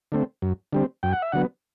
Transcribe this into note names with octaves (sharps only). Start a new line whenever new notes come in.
D3 A3 C4
F#2
D3 G3 C4
F#2 G5
F#5
E5
D3 F#3 B3 F#5